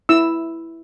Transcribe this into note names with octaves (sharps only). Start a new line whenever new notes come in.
E4 E6